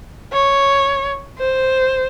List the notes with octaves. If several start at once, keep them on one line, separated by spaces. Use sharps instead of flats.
C#5
C5